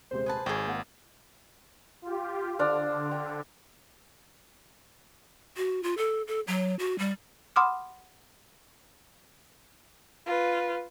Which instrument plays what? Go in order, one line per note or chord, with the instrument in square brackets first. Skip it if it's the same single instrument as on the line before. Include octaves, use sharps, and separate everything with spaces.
[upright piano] D#1 C3 G#3 [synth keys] C5
[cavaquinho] G#4 B4 A5
[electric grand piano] G#1 [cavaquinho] G#4 G5 [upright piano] C#6
[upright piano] A#3 F#5
[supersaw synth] F4 G4
[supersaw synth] D3 [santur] D4 C5 F5
[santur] G5
[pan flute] F#4
F4
A4
A4
F#3
F#4
G3
[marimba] F#5 B5 C6 D6 D#6 F6
[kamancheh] F4 B4